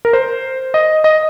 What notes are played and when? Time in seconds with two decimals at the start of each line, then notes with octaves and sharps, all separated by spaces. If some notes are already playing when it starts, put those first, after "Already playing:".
0.05 A#4
0.13 C5
0.74 D#5
1.04 D#5